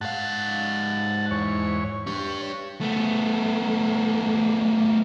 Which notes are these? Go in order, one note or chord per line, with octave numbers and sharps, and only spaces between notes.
G#2 F5 F#5 A5
E2 C#5
D4 G4 C#5
A3 B3